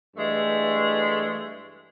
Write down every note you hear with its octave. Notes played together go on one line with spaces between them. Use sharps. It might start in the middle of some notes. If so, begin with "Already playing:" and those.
G2 E3 G#3 A3